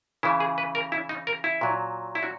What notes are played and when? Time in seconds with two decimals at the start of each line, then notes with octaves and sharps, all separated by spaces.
0.23 C#3 E3 E4
0.40 G#4
0.58 B4
0.75 A#4
0.92 E4
1.09 D#4
1.27 A#4
1.44 E4
1.61 A#2 F#3
2.15 E4
2.23 F#4